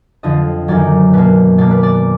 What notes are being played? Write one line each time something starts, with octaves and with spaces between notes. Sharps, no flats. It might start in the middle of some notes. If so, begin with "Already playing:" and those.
F2 D3 F3 D#5
F#2 D#3 F#3 D5
B2 A#3 B4
B2 A#3 D5
B4
D5